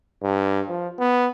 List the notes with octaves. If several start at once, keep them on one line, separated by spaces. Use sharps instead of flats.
G2
F3
B3